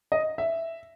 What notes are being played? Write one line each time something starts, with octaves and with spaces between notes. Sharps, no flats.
D#5
E5